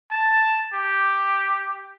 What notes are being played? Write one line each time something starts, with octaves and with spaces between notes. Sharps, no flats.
A5
G4